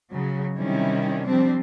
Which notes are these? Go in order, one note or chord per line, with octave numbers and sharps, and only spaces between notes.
C#3 F#3
C3 D#3 G3 C#4 E4
F3 G3 C4 D4